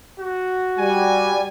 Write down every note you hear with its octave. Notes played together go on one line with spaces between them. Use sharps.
F#4
G3 G#5